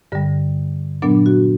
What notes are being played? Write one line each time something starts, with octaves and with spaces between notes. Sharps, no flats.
G2 D3 G3
A#2 F#3 B3 D4
F#4